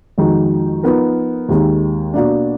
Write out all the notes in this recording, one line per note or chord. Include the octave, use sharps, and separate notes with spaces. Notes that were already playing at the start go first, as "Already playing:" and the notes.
F2 D#3 G#3 D#4 F#4
F3 B3 D#4 A#4
D#2 D#3 G#3
B2 A#3 D4